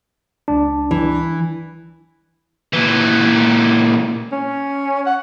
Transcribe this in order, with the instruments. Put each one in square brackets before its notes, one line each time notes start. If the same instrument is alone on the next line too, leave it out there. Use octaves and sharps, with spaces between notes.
[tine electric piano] C#2 D4
[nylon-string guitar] E3
[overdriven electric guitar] A#2 E3
[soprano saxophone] C#4
F#5